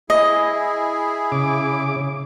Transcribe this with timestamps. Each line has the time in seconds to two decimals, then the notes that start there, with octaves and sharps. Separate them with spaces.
0.10 E4 G#4 D#5
1.32 C#3 D6